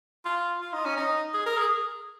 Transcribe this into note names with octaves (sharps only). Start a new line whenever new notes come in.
F4
F4
D#4
C#4
D#4
G#4
A#4
G#4